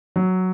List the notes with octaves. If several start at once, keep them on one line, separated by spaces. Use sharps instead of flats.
F#3